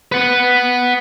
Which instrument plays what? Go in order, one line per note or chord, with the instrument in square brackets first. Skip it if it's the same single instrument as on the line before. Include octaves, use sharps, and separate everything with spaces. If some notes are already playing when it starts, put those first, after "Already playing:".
[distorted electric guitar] B4 F#5